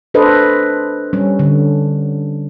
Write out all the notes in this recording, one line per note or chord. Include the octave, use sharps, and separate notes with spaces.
D4 A4 B4 C5 D#5
G3 C#4
D3